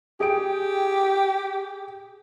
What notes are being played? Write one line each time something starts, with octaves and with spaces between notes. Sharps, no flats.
G4 G#4 G5 D7